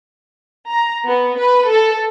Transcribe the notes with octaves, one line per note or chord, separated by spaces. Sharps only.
A#5
B3
B4
A4